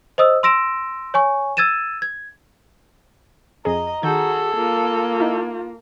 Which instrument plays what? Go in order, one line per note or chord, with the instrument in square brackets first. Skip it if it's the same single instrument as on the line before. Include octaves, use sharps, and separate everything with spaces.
[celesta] C5 D#5 D#6 E6
C6 E6 A#6 D7 E7
C#5 G#5 C#6
E6 G#6 A6 D#7 E7
G#6
[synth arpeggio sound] F2 G#4 [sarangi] D#5 [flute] A#5
[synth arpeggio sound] D#3 G6 [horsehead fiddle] F#4 G#4 [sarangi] A4
[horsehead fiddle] A#3 [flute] F4
[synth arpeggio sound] D#4 E4